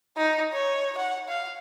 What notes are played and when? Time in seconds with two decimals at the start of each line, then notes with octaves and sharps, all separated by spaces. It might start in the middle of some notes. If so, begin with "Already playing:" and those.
0.17 D#4
0.52 C#5
0.97 F#5
1.28 F5